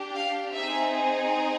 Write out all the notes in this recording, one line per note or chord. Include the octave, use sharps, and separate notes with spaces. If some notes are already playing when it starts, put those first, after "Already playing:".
Already playing: D4 G4
F5
C4 D#4 G#4 E5